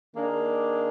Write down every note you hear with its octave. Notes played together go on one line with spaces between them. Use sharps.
D#3 A#3 D4 G#4